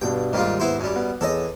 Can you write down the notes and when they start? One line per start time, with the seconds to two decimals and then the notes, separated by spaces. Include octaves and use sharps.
0.01 G2 B2 D4 G5
0.33 D#2 G#2 D#3 G3 F4
0.60 B3 E4 C5
0.80 F#2 G3
0.96 B3
1.21 E2 G#4 A4 C#5 D#5